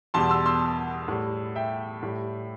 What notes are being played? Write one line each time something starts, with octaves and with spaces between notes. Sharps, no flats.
E2 B2 G3 A5 C6
C6 E6
C6 E6
A2 G3
E5 G5
A2 G3